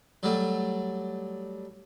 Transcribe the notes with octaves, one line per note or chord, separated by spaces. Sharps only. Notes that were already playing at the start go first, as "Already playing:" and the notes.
F#3 G3 A3